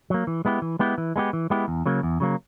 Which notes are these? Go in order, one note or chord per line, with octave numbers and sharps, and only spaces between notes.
F#3 A#3
E3
G#3 B3 E4 G4
E3
G#3 B3 E4 G4
E3
G#3 B3 E4 G4
E3
G#3 B3 E4 G4
E2
C#3 F#3 A#3
E2
C#3 F#3 A#3